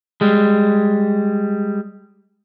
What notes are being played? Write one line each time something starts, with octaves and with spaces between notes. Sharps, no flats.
G3 G#3